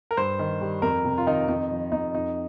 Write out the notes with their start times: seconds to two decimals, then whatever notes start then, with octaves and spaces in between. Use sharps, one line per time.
0.11 A#4
0.17 G2 C5
0.39 D#3
0.61 G3
0.82 F2 A#4
1.05 C3
1.18 F4
1.26 D#3 D#4
1.48 F2 D#4
1.71 F3
1.92 F2 D#4
2.14 F2 D#4